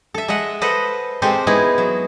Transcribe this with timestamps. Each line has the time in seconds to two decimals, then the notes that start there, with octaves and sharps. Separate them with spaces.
0.14 A4 E5
0.28 G#3 D#5 E5 F#5
0.61 A4 B4 C5 D#5 F#5
1.22 G#3 C4 G4 A4 C5
1.47 G#3 B3 D#4 E4 G#4
1.78 F#3